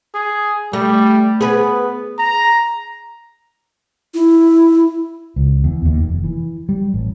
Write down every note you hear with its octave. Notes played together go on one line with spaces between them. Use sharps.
G#4
G3 A3
B3 G#4 B4
A#5
E4
C#2
E2
D#2
F1
E3
G3
A1